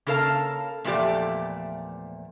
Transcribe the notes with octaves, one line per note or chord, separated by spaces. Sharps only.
C#3 A#3 A4 A#4 F5 A5
E2 A#2 F3 A3 G4 D5